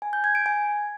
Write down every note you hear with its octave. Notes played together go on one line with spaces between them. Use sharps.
G#5
G6
G#6
D7
G#5